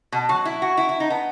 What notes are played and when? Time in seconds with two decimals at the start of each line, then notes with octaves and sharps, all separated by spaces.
0.12 B2
0.29 F#3
0.45 E4
0.62 F#4
0.77 E4
0.89 E4
1.00 D#4
1.10 B3